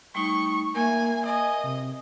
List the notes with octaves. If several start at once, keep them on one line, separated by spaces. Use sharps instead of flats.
G3 A3 D#4 C#6
A#3 A#4 E5 G#5
D#5 G#5
C3